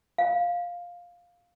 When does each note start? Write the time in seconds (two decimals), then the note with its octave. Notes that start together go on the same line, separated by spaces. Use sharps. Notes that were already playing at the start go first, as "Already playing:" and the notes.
0.18 F5